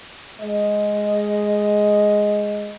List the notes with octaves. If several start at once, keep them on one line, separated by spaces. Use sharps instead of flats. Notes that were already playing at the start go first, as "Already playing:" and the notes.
G#3 D#5